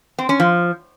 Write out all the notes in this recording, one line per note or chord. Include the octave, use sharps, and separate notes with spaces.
C4
C#4
F3